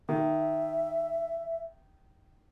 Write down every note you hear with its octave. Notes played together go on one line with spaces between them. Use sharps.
D#3 E5